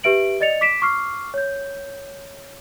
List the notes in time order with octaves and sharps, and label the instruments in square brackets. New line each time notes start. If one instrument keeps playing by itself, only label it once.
[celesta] G4 B4 E5 D7 F#7
D5 D#5 A6 C#7 F7
D6 B6 D7 E7
C#6 D6 F6 C7
C#5 G6